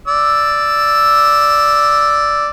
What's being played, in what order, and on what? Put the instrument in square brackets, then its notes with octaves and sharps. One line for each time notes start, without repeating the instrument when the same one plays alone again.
[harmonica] D5 E6